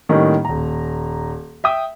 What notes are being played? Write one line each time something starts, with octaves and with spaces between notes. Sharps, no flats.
A2 D#3 G3 A#3 C#4 D#4
D#1 A#5
E5 G5 D#6